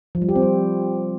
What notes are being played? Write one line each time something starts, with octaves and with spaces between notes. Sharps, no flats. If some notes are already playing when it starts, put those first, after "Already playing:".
F3
G3
G4
C4
G3